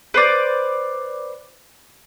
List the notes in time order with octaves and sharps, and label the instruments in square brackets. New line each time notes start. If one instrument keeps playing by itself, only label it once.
[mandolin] B4 C5 D5